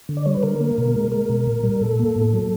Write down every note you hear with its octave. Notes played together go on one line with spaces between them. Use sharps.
D3
D5
G3 C#5
B4
D3 A#4
A#3
B2
G#3
G#3 A#4
B2
A#2
G3
A#2 A4
A#3
A2
F#3